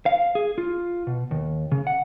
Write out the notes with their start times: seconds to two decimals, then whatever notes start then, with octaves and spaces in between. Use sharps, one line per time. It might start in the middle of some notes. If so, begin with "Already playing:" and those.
0.06 F5
0.35 G#4
0.58 F4
1.07 B2
1.31 D#2
1.72 C#3
1.87 F#5